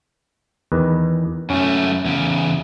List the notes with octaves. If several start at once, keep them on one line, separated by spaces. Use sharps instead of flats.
E2 D#3 B4
F#2 A3 C#4
E2 C#3